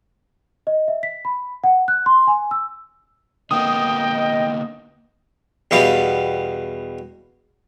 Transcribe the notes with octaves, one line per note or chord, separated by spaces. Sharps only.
D#5
E5
B6
B5
F#5
F#6
C6
G#5
E6
D3 A#3 B3 D#5 G5 D#6
E2 B2 G3 F5